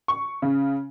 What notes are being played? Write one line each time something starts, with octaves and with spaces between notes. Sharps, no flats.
C#6
C#3